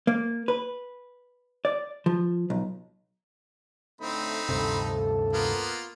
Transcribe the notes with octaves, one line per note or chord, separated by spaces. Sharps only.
A#3
B4
D5
F3
B1
A2 D3 A3 C4 D#4 B5
D2 G2 C3 A4
A#3 B3 F4